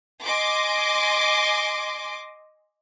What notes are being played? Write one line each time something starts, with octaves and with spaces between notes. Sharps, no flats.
D#5 G#5 C6 D6